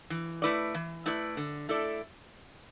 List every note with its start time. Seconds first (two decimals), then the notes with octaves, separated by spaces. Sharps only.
0.10 E3
0.42 A3 E4 B4 D5
0.75 E3
1.06 A3 E4 B4 D5
1.37 D3
1.69 A3 E4 A4 D5